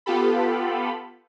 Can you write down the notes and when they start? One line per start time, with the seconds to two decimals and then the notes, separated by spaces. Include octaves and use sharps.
0.06 B3 F4 G4 A4 B5